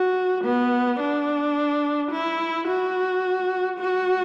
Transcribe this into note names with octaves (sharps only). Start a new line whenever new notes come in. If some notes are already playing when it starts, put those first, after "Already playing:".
Already playing: F#4
B3
D4
E4
F#4
F#4